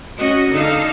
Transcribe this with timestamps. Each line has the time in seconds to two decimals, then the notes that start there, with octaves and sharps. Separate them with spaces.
0.19 C#4 F#4 D#5
0.52 D3 D#4 A4 F5